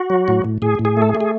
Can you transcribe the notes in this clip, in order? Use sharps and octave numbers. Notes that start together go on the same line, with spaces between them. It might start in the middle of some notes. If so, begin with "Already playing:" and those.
Already playing: F#4
F#3
A2
A2
A2 G#4
A2
G#4
A3
A4
G#4
A3
G#4